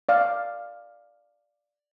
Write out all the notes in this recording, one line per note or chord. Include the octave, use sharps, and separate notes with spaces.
D5 F5